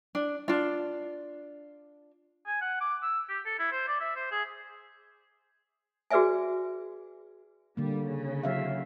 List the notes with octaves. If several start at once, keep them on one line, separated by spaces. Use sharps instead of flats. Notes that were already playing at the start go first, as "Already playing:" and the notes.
D4
D4 F4
G#5
F#5
D6
E6
G4
A4
E4
C5
D5
E5
C5
G#4
F#4 G#4 B4 D5 E5 G#5
D3 G3 A#3
C#3
F#3 E5 F5